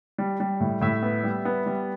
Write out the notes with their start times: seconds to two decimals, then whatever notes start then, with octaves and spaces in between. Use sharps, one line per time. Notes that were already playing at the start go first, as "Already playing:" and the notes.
0.18 G3
0.40 G3
0.60 A2
0.81 A2 E5
1.03 B3
1.23 G3
1.45 B3
1.66 G3